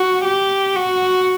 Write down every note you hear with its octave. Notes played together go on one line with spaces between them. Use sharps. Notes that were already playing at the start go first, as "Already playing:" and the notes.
Already playing: F#4
G4
F#4